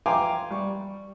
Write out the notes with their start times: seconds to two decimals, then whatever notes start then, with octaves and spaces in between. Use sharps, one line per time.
0.06 F5 G5 G#5 A#5 C6 D6
0.51 G3 C#6